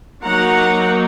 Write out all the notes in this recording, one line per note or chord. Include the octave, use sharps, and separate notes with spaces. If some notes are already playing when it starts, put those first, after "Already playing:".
F#3 A#3 D#4 F#5 A#5